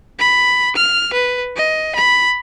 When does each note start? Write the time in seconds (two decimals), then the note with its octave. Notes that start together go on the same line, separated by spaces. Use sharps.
0.19 B5
0.76 F6
1.14 B4
1.57 D#5
1.95 B5